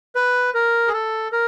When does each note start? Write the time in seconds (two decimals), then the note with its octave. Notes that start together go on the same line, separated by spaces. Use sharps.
0.15 B4
0.54 A#4
0.88 G#4
0.93 A4
1.32 A#4